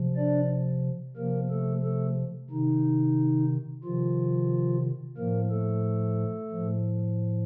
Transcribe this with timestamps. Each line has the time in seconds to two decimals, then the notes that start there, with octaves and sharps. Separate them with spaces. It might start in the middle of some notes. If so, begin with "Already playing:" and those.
Already playing: C3 F3
0.17 D4 D5
1.16 C3 F3 A#3 A#4
1.50 A3 A4
1.84 A3 A4
2.50 C3 D#3 D#4
3.84 C3 D#3 F3 F4
5.17 A2 F3 A#3 A#4
5.51 A3 A4
6.51 A2 F3